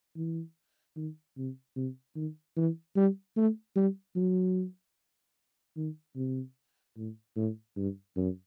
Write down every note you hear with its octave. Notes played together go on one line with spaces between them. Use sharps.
E3
D#3
C3
C3
D#3
E3
G3
A3
G3
F#3
D#3
C3
A2
A2
G2
F#2